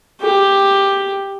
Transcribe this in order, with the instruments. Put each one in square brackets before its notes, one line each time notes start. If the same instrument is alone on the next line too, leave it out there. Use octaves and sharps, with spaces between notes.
[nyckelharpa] G4